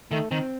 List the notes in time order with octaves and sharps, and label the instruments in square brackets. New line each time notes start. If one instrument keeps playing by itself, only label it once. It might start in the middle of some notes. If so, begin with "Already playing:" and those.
[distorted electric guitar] D#3 [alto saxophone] A3
[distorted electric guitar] D#3 [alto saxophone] C4